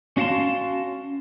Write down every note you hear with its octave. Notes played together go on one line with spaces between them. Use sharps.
C#4 F#4 F5 F#5 A5 C6